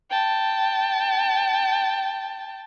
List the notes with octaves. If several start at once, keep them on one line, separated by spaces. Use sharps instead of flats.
G5 A5